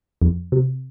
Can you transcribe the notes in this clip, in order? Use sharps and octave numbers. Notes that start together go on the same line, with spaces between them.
F2
C3